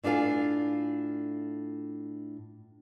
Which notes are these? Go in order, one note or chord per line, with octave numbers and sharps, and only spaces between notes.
A2 D4 F4 A#4 F5 G#5